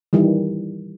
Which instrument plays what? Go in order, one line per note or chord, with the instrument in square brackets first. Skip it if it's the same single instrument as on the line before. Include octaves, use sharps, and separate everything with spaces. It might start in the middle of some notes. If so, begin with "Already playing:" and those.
[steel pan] D#3 E3 G3